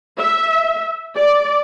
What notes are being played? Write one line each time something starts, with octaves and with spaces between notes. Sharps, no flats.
E5
D5